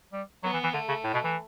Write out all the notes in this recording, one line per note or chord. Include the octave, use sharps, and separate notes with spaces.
G3
F#3 B3
E3
E3
D3 A3
C#3
A2
B2
E3